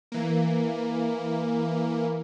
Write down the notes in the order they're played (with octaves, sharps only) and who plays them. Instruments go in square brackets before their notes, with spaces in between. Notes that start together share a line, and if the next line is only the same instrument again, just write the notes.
[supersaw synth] E3 A#3